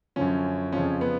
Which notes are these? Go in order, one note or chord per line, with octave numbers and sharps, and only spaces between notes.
F#2 D3 F3 C#4
F2 C#3 F3 C#4
B3